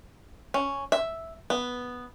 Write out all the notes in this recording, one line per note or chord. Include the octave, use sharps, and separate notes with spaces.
C#4
E5
B3